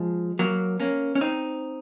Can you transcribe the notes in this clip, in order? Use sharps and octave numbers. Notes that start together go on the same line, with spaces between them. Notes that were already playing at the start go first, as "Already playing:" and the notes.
Already playing: F3 G#3
F#3 A#3
A#3 C#4
C#4
C4 D#4